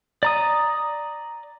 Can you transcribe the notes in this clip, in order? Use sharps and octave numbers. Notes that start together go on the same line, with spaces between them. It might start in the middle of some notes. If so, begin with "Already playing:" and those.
D5 A#5 D#6